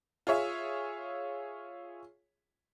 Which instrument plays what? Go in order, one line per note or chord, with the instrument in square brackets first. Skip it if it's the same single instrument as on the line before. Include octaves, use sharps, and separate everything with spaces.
[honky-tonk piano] F4 G#4 C#5 E5